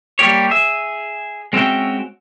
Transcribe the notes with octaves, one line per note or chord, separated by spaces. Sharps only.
G3 A#3 G4 C#5
G#4 E5
G#3 C4 C#4 F#4 E5 G5